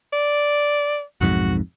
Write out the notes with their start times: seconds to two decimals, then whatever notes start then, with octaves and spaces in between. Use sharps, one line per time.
0.13 D5
1.21 B1 F2 G#2 F#4